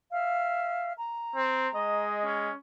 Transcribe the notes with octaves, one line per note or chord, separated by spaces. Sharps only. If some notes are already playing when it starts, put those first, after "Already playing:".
E5 F5 F6
A#5
C4
G#3 D#5
C#4